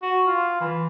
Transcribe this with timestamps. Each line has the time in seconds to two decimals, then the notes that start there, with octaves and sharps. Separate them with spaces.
0.02 F#4
0.26 F4
0.60 E3